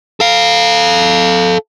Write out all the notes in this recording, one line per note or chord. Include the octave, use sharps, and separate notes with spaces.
A4 F5